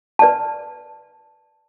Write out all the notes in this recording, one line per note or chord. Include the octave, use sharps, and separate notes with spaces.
B4 D5 A5